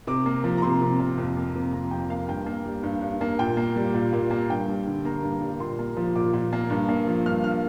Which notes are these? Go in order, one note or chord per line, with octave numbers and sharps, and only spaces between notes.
C3 D6
A#3
F3
A#5
C3 C6
C3
A#3
F2
A#3
C3
F2 A#5
F2 G5
A#3 F5
G2 G5
A#3
G3
G2
G2
A#3
A#2 G5
A#3
G3
A#2
A#2
A#3
G2 G5
G3
D3
A#3 A#5
G2
G3
A#2 C6
A#3
F3
A#2 D6
A#2
A#3
G2
A#3
F3
G2 F6
F6